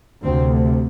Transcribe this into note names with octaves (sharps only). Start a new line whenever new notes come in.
D2 C3 C4